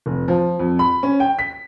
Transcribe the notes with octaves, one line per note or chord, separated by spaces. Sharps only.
F1
F3
F2
B5
C#4
G5
B6